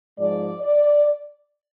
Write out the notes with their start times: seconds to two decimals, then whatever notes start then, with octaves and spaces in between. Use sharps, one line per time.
0.18 G#2 F3 G#3 D5
0.62 D5